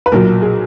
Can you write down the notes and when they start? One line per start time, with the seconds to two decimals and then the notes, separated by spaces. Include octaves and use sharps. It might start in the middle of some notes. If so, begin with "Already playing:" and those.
0.06 B4
0.12 B1 A#2 F#3 A#4
0.42 G#4